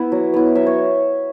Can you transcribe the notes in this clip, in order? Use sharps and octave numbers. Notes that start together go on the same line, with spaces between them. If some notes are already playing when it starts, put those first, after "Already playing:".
Already playing: B3 E4 E5
F#3
B3 E4
F#3 E5
C#5